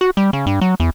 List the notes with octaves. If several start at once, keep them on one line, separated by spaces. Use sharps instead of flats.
F#4
G3
C#3
G2
F#3
E2